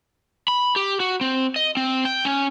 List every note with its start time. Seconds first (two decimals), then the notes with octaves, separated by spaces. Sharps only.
0.48 B5
0.76 G4
1.00 F#4
1.21 C4
1.56 D#5
1.77 C4
2.05 G5
2.25 C#4